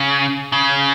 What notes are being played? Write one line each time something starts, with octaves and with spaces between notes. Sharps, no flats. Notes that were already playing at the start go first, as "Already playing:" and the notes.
Already playing: C#3
C#3